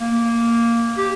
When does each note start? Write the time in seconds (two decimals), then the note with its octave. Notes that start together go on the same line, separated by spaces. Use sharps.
0.01 A#3
0.98 G4